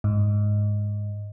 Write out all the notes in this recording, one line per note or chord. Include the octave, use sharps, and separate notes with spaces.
G#2